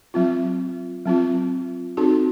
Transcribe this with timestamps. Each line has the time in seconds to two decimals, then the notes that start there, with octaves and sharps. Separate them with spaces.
0.14 F#3 C4 F4
1.06 F#3 C4 F4
1.97 C4 D#4 F#4 A4